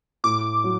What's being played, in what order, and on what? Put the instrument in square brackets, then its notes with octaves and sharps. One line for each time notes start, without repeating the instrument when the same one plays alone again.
[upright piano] A2 [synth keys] D6
[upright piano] F#3